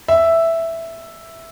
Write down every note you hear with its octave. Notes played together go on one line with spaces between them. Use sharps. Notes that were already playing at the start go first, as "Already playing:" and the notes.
E5